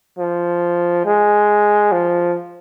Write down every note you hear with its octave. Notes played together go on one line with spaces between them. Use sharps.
F3
G#3
F3